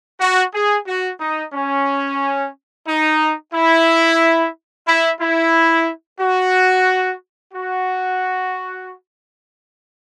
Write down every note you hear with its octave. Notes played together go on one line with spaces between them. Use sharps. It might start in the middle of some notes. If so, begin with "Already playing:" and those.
F#4
G#4
F#4
D#4
C#4
D#4
E4
E4
E4
F#4
F#4